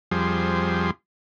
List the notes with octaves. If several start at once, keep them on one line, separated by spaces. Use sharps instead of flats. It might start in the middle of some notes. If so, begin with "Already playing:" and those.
F2 F3 G3 G#4 C5